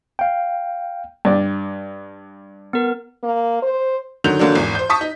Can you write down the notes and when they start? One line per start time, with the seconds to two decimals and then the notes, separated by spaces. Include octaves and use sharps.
0.19 F5 G5
1.25 G2 D5
2.73 B3 A#4
3.23 A#3
3.62 C5
4.24 D3 D#3 F#3 G6 F7
4.39 D3 F#3 A#3 D4
4.55 G#1 E2
4.75 C5 G6
4.89 A5 C#6 D#6 B6
5.01 D#4